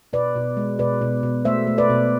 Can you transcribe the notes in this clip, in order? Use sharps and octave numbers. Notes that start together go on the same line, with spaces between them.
B2 B4 D5
B2
G#3
B2 B4 D5
B2
B2
A3 C5 E5
A3
B4 D5
B2